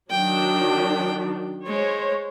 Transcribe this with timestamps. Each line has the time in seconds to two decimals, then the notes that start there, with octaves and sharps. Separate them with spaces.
0.11 D#3 F#3 D4 G5
1.67 G#3 C5 C#5